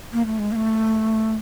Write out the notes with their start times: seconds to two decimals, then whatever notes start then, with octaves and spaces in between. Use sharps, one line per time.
0.13 A#3
0.26 A3
0.39 G#3
0.52 A#3
0.56 A3